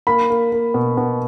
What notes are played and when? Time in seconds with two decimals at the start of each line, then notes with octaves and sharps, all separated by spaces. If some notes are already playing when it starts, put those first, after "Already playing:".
0.07 A#3 B5
0.30 A#3
0.52 A#3
0.74 B2
0.97 B2